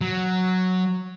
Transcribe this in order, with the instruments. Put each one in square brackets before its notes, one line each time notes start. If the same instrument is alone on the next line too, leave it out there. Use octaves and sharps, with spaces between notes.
[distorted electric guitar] F#3